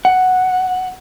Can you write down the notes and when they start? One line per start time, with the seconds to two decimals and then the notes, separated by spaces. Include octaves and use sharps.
0.05 F#5